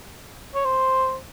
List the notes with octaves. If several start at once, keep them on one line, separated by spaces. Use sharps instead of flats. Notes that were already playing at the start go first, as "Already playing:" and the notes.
C#5
C5